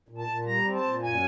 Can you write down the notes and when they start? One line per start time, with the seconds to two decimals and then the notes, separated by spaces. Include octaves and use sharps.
0.09 A#2
0.18 A5
0.27 A#2
0.46 G3 A#5
0.65 C4
0.75 A5
0.84 A#2
1.03 F#2 G#5